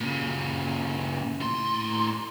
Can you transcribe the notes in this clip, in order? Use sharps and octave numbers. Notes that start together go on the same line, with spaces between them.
A#2 C#3
A2 C6